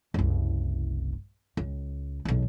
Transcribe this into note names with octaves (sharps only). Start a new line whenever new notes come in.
F#1 C2
C#2
B1 E2